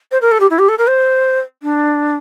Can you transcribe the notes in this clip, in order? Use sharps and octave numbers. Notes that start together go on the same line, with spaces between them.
C5
A#4
A4
G4
E4
G4
A4
A#4
C5
D4